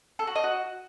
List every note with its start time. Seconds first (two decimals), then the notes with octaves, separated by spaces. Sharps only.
0.19 A4
0.27 F#4
0.35 D#5
0.44 F#4